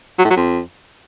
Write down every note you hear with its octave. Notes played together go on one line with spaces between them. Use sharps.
F#3
A2
F#3
F2